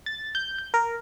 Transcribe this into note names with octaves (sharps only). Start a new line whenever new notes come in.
A6
G6
G6
A#4